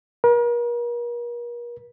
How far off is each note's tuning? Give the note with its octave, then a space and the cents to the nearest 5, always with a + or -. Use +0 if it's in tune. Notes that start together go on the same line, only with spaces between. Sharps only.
A#4 +40